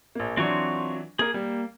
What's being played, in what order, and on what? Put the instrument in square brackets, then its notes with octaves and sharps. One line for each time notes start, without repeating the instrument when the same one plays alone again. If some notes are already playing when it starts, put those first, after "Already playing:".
[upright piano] A#1 A#3
[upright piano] E3 F#3 D4 [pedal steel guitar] C4 F4 C#6
[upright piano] A#3 A#4 [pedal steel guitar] G#4
[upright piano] G3 [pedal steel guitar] A#3